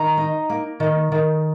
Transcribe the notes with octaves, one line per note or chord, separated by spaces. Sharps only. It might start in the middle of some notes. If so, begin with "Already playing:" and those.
Already playing: D#3 A#5
D#4
A#3
D#3
D#3